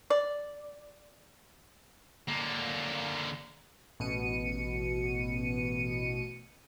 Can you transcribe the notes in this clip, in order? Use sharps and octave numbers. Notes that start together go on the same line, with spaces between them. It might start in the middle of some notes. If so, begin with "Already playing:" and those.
D5
D3 A#3
A1 B2 C#7 D#7